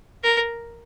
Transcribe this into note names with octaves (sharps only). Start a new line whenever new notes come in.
A#4